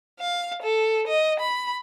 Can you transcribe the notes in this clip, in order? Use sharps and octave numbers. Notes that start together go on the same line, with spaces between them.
F5
A4
D#5
B5